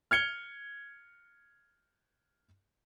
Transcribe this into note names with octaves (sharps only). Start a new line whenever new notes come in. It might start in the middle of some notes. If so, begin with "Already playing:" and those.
F6 G#6 C#7 G7